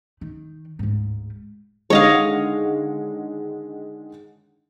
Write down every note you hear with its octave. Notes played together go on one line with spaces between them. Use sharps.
D#3
D1 G#2
D3 D#3 G#3 C#5 D#5 F5